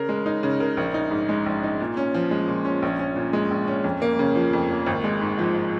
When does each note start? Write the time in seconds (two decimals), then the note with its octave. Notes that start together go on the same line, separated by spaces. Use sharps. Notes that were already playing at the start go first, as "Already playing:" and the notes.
Already playing: C#3 A#4
0.09 G#3
0.26 D#4
0.43 C#3
0.60 A#4
0.77 A#1
0.94 D#4
1.11 G#2
1.29 G#3
1.46 A#1
1.63 D#4
1.80 A#2
1.97 C#4
2.14 F3
2.31 G#3
2.48 A#2
2.65 C#4
2.82 A#1
2.99 C#4
3.16 A#2
3.33 G#3
3.51 A#1
3.68 C#4
3.84 F2
4.02 A#3
4.19 C#3
4.35 F3
4.53 F2
4.70 A#3
4.86 G#1
5.04 G#3
5.21 G#2
5.39 F3